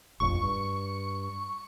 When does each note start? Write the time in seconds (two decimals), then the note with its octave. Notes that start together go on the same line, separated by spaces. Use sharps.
0.20 F1 A#1 F2 C#6
0.43 G2